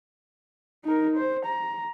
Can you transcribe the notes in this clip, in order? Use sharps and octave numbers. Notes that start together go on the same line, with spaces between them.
D#4 A#4
C5
A#5